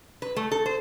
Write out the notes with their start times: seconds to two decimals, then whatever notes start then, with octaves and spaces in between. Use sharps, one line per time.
0.22 B4
0.36 A3
0.52 A4
0.66 C5